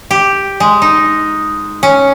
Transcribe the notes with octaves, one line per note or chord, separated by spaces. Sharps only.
G4
G#3
D#4
C#4